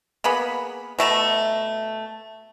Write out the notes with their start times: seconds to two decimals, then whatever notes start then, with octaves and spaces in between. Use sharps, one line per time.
0.24 A#3 B3 G#4 B5
0.99 B2 A3 A5 A#5